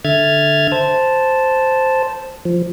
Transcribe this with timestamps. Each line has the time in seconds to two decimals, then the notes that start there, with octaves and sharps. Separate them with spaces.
0.05 D3 E5 F6 G#6 A6
0.72 C5 A5
2.45 F3